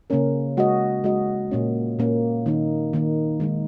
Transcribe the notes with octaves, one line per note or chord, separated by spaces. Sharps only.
C#3 A#3 C#4 A#4
G#3 F#4 D#5
G#3 F#4 D#5
A#2 A#3 C#4
A#2 A#3 C#4
D#3 A#3 D#4
D#3 A#3 D#4
D#3 G#3 D#4